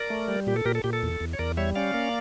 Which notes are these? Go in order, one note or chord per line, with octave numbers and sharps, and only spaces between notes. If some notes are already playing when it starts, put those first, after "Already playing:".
Already playing: A#4 D5
A3
G3
A#2 G4
A4
A#2 G4 A#4
A4
A#2 G4
A4
E2
E2
C#5
E2 A#4 D5
G3 C#5 E5
C#4 D5 F5
A#3